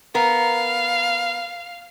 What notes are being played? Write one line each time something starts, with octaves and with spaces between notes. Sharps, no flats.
B3 A#4 F5